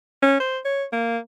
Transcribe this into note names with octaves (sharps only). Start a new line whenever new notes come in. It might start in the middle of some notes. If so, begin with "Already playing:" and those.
C#4
C5
C#5
A#3